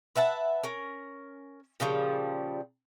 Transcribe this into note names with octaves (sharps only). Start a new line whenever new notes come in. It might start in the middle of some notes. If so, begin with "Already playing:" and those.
B4 E5 F#5 A5
C#4 A#4
A#2 C#3 F3 G3